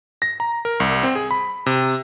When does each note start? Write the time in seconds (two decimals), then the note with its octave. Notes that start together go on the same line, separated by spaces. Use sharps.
0.22 A#6
0.40 A#5
0.65 A#4
0.80 C2
1.03 C4
1.15 G#4
1.31 B5
1.66 C3